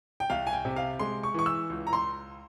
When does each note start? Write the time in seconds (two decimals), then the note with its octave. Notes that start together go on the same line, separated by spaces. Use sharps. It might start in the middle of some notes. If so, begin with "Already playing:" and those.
0.20 G5
0.30 C2 F5
0.47 G#5
0.53 G5
0.65 C3
0.76 F5
0.99 G#3 C6
1.23 C#6
1.34 E3 C#6
1.46 E6
1.70 C#2
1.87 A#5
1.93 C6